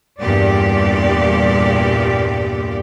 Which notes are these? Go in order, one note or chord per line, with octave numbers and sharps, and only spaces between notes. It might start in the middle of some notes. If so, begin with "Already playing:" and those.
E2 G2 A#2 G4 D5